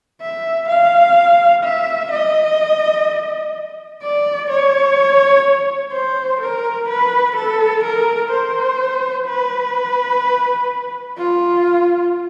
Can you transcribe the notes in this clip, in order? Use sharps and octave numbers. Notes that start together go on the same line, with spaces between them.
E5
F5
E5
D#5
D5
C#5
C5
A#4
B4
A4
A#4
C5
B4
F4